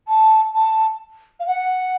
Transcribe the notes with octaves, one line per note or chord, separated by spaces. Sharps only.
A5
A5
F5
F#5